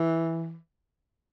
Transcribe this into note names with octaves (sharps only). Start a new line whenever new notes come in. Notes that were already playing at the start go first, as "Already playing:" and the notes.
Already playing: E3